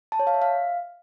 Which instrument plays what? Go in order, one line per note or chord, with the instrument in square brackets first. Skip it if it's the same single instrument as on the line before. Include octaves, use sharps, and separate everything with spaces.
[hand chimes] A5
C#5
F5
E5
F5